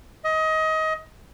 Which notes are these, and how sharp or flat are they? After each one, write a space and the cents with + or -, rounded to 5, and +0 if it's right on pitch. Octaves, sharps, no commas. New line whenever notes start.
D#5 +25